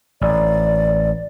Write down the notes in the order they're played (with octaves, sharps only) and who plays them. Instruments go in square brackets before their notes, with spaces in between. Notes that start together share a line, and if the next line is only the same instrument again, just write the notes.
[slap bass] A1 [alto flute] D5